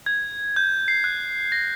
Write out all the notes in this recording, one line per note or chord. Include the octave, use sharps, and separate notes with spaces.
G#6
G6
C7
F#6
A#6